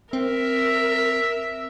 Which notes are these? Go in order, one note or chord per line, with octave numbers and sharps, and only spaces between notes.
C4 A#4 E5